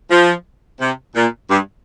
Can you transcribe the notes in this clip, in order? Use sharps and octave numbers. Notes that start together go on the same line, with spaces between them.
F3
C3
A#2
G2